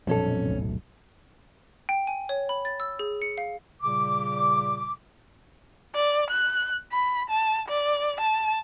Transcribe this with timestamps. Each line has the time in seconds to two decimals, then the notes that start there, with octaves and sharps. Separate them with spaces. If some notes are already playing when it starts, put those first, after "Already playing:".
0.07 B1 F2 A#2 G3 C4 C#4 A4
0.46 D1 G#1 A3
1.89 G5
2.07 G#5
2.29 C#5
2.49 B5
2.65 A6
2.80 E6
2.99 G#4
3.22 C#7
3.38 F5
3.82 A#2 C#3 G3 D6
5.95 D5
6.30 F#6
6.92 B5
7.30 A5
7.68 D5
8.21 A5